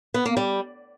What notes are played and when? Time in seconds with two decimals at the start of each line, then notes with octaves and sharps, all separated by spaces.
0.14 B3
0.25 A#3
0.37 G3